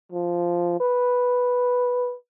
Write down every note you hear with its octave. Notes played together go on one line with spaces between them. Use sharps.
F3
B4